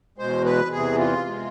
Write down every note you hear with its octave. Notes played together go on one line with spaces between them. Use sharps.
E2 B2 G#3 C5
B4
E2 C3 E3 G#4
F4
C3 G#3